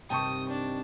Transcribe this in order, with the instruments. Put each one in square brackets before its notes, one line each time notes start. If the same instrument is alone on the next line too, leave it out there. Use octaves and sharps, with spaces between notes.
[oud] G2 C3 D#3 [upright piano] G5 A5 C#6 [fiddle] D#6
[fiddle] D4